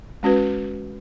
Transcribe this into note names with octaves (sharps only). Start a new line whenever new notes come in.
G#3 C#4 F#4 B4